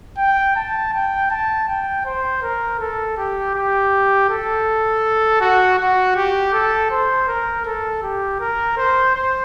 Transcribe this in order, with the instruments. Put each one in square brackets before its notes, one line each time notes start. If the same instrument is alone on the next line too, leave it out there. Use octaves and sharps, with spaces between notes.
[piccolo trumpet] G5
A5
G5
A5
G5
C5
A#4
A4
G4
G4
A4
F#4
F#4
G4
A4
C5
A#4
A4
G4
A#4
C5
C5